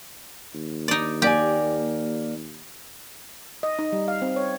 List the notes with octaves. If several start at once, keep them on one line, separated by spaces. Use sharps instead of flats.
D#2
D#4 D5
A#3 G4 D5 G#5
D#5
D#4
G3
F5
C4
C#5